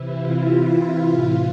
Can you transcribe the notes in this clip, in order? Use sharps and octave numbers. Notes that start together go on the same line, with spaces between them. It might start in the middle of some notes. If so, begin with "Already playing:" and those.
Already playing: C3 E3 E4
F4
A2 E3 F4